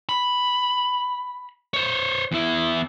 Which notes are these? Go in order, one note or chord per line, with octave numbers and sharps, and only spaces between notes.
B5
C5 C#5
E2 E4